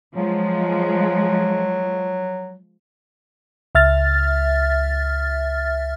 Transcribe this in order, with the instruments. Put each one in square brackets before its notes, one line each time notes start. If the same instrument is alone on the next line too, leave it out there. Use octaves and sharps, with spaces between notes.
[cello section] F3 G#3 [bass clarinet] F#3
[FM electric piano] C#2 E5 F6 A6